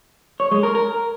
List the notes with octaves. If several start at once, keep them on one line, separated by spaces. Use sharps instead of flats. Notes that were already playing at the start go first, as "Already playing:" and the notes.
C#5
G#3
A#4
A#4